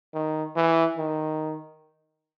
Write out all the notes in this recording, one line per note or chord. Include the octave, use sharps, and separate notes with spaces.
D#3
E3
D#3